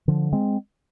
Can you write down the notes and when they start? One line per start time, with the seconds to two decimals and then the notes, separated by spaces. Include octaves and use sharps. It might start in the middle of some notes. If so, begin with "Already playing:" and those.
0.08 D3 F3
0.33 G#3 C4